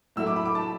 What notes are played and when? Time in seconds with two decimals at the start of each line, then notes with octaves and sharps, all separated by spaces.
0.16 A2 F#3 A3 E4 E6
0.27 D6
0.36 B5
0.45 D6
0.55 A5